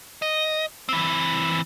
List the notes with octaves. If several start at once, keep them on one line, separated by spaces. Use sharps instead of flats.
D#5
E3 C4